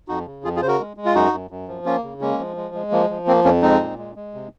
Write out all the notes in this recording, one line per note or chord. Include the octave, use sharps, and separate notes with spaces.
F2 D#4 F#4
C#3
F2 F4 G#4
F4 G#4
C#3 C5
F#4 A#4
G#3
G#3
F4
F#2 D#4 F#4
F#2
F#2
F3
A#3 C#4 F4
C#3
G#3 A#3 C#4
F3
G#3
G#3
F3 A#3
F3
A#3 C4
F2 A#3 C#4
G#3 C4 D#4
A#2
G#3
G#3
C3